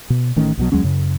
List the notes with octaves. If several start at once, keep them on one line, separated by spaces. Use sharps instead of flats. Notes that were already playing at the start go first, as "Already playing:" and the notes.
B2
A1 D#3 A3 C#4
B1 B2 F#3
D#2 F#3 G#3 C#4
F#2 C#3